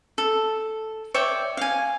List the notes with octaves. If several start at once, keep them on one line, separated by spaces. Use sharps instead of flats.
A4
C#5 D5 E5 G5
F5 G#5